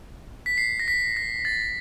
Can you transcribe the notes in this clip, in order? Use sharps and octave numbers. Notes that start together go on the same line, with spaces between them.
B6
C7
A#6
B6
A#6
A6